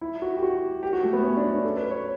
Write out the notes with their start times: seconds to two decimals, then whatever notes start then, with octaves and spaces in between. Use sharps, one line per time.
0.01 E4
0.22 F#4
0.37 G4
0.42 F#4
0.83 G4
0.93 F#4
1.03 A3
1.13 B3
1.24 C#4
1.37 D4
1.50 D4
1.64 A4
1.77 B4
1.91 C#5